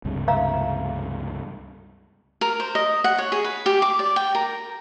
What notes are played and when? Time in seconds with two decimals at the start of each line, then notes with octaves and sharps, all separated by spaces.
0.05 C#2 G2 C3
0.28 E5 F5 A#5
2.41 A#4
2.60 C5
2.75 D#5
3.04 F#5
3.18 C#5
3.32 G#4
3.44 B4
3.66 G4
3.82 D6
3.99 D5
4.16 G5
4.35 A#4